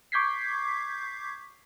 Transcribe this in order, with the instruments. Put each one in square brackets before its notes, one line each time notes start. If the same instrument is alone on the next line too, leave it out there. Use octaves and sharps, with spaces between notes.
[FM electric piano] C#6 D6 G6 G#6 B6 C7